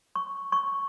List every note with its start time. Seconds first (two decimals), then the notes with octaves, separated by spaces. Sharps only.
0.15 C#6
0.52 C#6